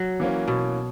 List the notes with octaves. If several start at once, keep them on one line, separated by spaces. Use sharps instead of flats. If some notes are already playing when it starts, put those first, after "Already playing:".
Already playing: F#3
E3 A#3 C#4
B2